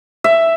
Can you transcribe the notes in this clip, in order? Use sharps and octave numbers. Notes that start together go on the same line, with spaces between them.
E5